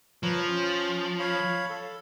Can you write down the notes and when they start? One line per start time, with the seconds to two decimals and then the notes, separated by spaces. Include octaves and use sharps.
0.23 F3 B4 C#5 A#5
0.48 C#4
1.19 C#5 F5 B5
1.70 A4